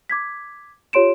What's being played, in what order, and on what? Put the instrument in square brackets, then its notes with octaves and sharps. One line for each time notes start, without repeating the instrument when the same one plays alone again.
[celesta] D6 G#6 B6
F4 G4 C#5 C6 D7 E7